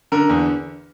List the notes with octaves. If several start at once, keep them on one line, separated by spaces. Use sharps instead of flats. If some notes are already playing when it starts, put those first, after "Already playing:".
D3 A#4
E2